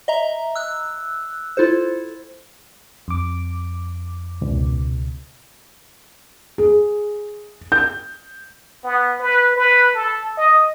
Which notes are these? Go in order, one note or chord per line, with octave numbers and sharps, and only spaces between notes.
D#5 E5 A#5
E6 F#6
E4 F4 A4 C5
F2 D6
C#2 B2
G#4
G6
B3
B4
B4
A4
D#5